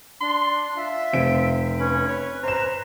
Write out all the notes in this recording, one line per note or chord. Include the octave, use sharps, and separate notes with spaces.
D4 C6
F4 E5
F1 C4 D7
C#4 B4
B4 C#5
C5 A#5 E7